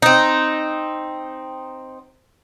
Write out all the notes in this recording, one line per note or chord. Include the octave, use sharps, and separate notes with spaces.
C4 D#4